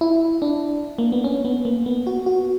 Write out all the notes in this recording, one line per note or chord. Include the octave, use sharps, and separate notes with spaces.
E4
D4
A#3
B3
C#4
B3
A#3
B3
F#4
F#4